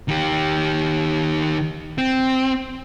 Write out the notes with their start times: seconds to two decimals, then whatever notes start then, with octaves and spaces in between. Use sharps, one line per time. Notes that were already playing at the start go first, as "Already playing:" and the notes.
0.08 D#3 G4
1.98 C4